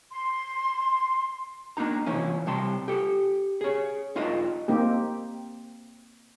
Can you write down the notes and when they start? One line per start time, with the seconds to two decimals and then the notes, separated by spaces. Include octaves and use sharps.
0.12 C6
1.77 A#3 D4 D#4 A#5
2.06 C2 A#2 E3 F3 C#4
2.46 C3 G3 A5 C6
2.88 G4 A4
3.61 G#4 C#5
4.16 G2 D#4 F4 A#4 D#5 E5
4.68 A#3 C4 D#4 G4